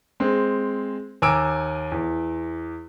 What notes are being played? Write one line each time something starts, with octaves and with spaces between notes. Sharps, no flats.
G#3 C4
D#2 G#5 A#5 D6 E6 D7
E2